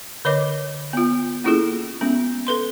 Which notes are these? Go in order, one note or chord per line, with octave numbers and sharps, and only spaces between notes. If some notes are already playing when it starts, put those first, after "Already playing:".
D3 B4 C#5 D#5 D6
B3 F4
A#3 C#4 E4 F4 G#4 A4
G#3 B3 C#4
A4 B4 C6